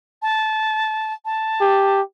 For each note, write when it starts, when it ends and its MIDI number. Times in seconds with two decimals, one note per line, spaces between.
0.22 1.13 81
1.25 2.00 81
1.61 2.01 67